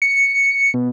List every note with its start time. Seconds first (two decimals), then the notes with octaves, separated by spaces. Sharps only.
0.02 C#7
0.74 B2